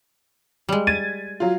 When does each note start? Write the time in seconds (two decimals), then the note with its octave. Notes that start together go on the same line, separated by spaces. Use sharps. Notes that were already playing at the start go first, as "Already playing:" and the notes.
0.69 G3 G#3
0.87 G#6 A6 D#7
1.40 F#3 F4